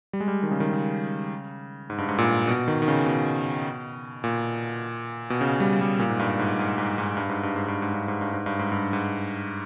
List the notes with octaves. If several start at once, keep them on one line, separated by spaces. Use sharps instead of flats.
G3
G#3
G3
D#3
C#3
D#3
C#3
G#2
G2
G#2
A#2
B2
D#3
D#3
C#3
B2
A#2
B2
C#3
G3
G3
A#2
G#2
G2
G#2
G#2
G#2
G#2
G2
G#2
G2
G#2
G2
G#2
G2
G#2
G2
G#2
G2
G#2
G2
G#2